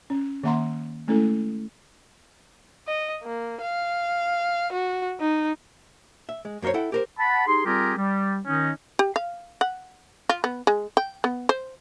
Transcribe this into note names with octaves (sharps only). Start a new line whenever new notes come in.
C#4
D#3 A#3 E5 F#5 A#5 C6
G#3 A3 C#4 E4 A4
D#5
A#3
F5
F#4
D#4
E5
G#3
F#2 A#3 A#4 C5 C#5
E4 A4 F#5 G5
G4 A#4 C5
F#5 A5 B5
D#4 G4 G#4 C6
G3 C4 F4 G4 G#4 A#4
G3
D#3 C#4 D#4
G4
F5
F#5
F4
B3
G#3
G5
B3
C5